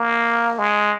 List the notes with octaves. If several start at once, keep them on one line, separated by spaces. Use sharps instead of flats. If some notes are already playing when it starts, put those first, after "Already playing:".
Already playing: A#3
G#3